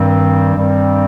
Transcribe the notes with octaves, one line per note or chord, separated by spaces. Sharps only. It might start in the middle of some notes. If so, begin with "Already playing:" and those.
Already playing: G2 D#3 G3 C4
G2 D#3 G3 C4